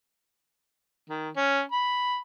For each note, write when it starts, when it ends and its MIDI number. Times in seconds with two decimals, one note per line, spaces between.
1.10 1.29 51
1.36 1.62 61
1.72 2.18 83